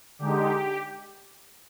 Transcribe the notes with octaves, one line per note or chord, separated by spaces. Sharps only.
D3 G#3 D#4 G4